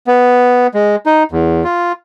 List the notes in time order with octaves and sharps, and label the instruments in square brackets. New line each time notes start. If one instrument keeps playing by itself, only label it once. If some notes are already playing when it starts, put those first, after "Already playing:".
[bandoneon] B3
G#3
D#4
E2
F4